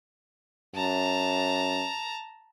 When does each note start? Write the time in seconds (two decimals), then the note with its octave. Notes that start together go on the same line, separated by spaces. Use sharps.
0.75 F#2 A5 A#5